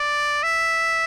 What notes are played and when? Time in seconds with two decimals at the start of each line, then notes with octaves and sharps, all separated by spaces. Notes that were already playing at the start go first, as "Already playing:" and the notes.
Already playing: D5
0.43 E5